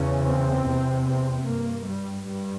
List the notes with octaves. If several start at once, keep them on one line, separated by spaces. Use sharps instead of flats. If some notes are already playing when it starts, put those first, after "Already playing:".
Already playing: E2 C#3 C#4
C4
E2 C3
C4
G2 A#3
G3
G2 G3